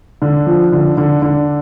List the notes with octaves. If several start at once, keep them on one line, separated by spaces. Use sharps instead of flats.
D3
F3
D3
D3
D3